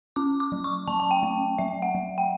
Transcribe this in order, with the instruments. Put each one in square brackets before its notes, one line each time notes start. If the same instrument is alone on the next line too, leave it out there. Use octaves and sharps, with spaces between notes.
[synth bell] C#4 D6
D6
F#3
C#6
F#3 A5
A5
G5
A3
F#3 E5
F#5
F#3
G5